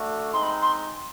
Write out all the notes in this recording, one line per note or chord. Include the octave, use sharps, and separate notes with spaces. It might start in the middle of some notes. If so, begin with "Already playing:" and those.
Already playing: A3 D4 F#4
G#3 C4 D#4 C6
B5
C6